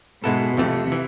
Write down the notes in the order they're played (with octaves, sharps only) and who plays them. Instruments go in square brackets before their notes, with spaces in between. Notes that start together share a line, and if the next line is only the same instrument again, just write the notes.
[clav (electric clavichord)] G#2 G#3 B3 E4 A4 [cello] B2
[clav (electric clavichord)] F2 E3 A3 [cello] C3
[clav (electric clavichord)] E3